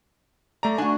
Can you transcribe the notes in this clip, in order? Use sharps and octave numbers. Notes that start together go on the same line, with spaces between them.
A3 D5 A#5
D4 F#4 G#5